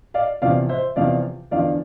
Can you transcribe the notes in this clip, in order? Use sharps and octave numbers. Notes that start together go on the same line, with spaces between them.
D5 F5
E2 C3 F3 D5 F5
C5 E5
E2 C3 F3 D5 F5
E2 D3 F3 D5 F5